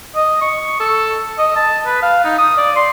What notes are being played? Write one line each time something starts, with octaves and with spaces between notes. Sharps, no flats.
D#5
C#6
A4
D#5
A5
B4
F5
D#4
D#6
D5
C6